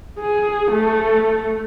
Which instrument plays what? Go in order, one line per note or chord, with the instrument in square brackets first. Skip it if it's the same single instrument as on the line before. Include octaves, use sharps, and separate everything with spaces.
[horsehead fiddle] G#4
A3